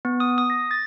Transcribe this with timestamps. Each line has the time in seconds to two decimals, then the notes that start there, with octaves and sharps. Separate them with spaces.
0.05 B3
0.20 D#6
0.38 D#6
0.50 A#6
0.71 A6